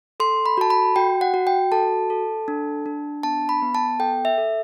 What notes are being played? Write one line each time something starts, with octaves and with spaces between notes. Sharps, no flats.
A4 C6
B5
F#4 A5
B5
F#4 G5
F#5
F#4
G5
A4 A5
A4
D4
D4
B3 A5
B5
B3
A5
A4 G5
E5
A4